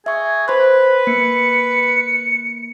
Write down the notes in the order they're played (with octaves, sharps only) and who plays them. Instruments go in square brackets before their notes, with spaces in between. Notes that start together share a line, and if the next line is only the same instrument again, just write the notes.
[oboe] G#4 [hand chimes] E5 C#6
[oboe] B4 [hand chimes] C5 C6 F#6
[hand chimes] A#3 [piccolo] C#7